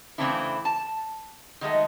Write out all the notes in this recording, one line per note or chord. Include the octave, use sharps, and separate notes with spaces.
C#3 E3 A3 C4 D4 E4
A5
D#3 F#3 G#3 A3